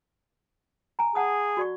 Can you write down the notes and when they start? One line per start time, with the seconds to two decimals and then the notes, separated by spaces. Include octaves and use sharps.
0.99 G#5 A#5
1.15 G#4 F#5 A5 D#6
1.57 F#4 D5 C#6